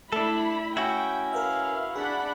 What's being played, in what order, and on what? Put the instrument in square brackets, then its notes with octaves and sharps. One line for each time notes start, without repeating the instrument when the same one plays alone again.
[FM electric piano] A3 [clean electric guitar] D4 A4 [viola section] E4 B5
[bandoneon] C#4 [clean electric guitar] E4 F#4 [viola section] G5
[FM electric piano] A#4 B4 E5 [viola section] F5
[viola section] D4 F#5 B5 [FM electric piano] G#4